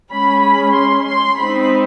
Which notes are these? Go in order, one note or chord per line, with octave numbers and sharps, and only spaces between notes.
G#3 C#4 B5
B5
C6
C6
G#3 C4 D#4 B5